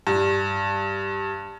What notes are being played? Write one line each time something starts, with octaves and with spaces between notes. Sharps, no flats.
G2